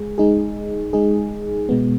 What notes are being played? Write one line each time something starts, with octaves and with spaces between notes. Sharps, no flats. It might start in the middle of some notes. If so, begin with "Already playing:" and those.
Already playing: G#3 G#4
G#3 D#4 G#4
G#3 D#4 G#4
B2 G#3 B3